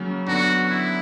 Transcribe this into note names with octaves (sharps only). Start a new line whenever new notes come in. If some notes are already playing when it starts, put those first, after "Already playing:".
Already playing: C#3 F#3 A#3 C#4
D3 F#3 B3 D4 F#4
E4